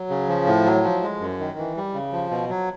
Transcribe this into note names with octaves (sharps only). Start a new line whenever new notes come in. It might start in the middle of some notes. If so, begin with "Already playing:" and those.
Already playing: F#3
C#3
F3
A2
F#3
F3
G#3
F#2
D#3
E3
G3
C#3
F3
B2
F#3